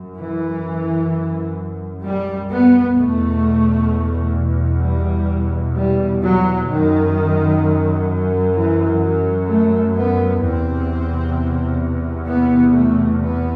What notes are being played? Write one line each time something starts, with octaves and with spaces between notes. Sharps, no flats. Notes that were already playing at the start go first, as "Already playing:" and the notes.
Already playing: F#2
E3
G3
B3
E2 B2 A3
G3
G3
F#3
F#2 D#3
E3
F#3
A3
B3
E2 C3 C4
B3
A3
B3